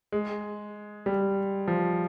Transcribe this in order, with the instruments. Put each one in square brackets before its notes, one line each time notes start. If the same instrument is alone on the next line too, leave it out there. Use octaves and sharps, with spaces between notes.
[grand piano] G#3
G3
F3